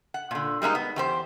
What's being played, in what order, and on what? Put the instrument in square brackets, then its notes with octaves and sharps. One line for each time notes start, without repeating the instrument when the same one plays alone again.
[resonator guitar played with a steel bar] F#5
A#2 D3
G3 G#3 A#3 D#4
B3
E2 G4 C5